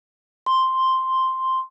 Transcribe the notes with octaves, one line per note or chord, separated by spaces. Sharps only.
C6